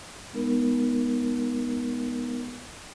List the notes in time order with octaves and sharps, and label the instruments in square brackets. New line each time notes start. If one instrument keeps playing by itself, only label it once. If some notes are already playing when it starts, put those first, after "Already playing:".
[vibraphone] G#3 B3 D#4 A#4